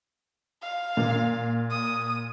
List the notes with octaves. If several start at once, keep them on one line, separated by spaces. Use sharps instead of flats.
F5
A#2
D#6